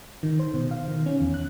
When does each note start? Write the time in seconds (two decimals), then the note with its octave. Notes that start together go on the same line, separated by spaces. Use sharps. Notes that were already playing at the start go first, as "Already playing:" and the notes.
0.23 D#3
0.39 C5
0.54 B2
0.71 F5
0.88 D#3
1.06 C#4
1.21 E2
1.34 F#6